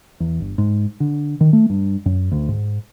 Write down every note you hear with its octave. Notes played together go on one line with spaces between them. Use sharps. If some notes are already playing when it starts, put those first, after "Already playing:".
E2
G1
G#2
D3
D#3
A3
G2
F#2
D2
G#2